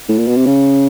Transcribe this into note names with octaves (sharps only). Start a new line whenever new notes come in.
A2
A#2
B2
C3
C#3